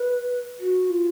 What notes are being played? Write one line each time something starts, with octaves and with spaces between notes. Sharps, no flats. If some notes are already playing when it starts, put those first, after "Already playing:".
Already playing: B4
F#4
F4